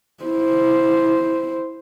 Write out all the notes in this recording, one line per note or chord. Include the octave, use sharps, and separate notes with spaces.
E4 C5